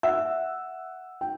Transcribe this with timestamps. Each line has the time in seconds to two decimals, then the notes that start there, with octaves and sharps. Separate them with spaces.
0.03 E5 F#5 E6
1.21 G5